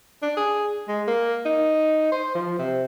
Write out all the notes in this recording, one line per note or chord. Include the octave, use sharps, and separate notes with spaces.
D4
G#4
G#3
A#3
D#4
C5
F3
C3